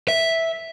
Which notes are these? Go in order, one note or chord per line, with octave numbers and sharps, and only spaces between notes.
E5